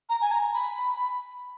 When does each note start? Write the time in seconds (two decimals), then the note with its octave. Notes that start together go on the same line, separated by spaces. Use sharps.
0.09 A#5
0.22 G#5
0.32 A#5
0.54 B5